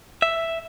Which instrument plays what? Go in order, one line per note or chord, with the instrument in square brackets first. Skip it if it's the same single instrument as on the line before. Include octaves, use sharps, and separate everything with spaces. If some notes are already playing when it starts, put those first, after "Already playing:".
[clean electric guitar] E5